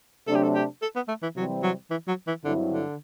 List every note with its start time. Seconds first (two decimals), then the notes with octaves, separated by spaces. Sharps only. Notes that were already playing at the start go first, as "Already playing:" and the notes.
0.27 C3 F#3 A3 D4 A4
0.35 G4
0.43 A4
0.55 G4
0.82 A4
0.96 B3
1.08 A3
1.23 E3
1.36 C3 E3 F#3 G3 C4
1.63 F#3
1.90 E3
2.08 F#3
2.27 E3
2.44 G2 D3 F#3 C4 E4
2.71 D3